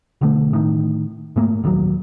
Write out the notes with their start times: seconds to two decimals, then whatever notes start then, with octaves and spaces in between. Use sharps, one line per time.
0.21 B1 D3 A3
0.53 A2 D#3
1.36 G#2 A3 A#3
1.64 A#1 D#2 A#2 F#3